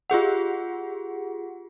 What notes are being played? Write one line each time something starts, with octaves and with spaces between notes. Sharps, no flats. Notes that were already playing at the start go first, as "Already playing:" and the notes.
F4 G4 G#4 F#5